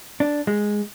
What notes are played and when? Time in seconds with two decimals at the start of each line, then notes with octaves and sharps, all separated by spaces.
0.20 D4
0.47 G#3